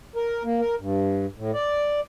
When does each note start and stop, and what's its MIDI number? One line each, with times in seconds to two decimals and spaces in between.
0.16 0.43 70
0.44 0.61 58
0.61 0.75 70
0.80 1.26 43
1.37 1.51 45
1.54 2.00 74